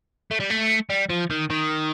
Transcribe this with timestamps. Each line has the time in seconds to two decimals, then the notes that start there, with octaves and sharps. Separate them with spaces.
0.31 A3
0.40 G3
0.50 A3
0.90 G3
1.10 F3
1.31 D#3
1.50 D#3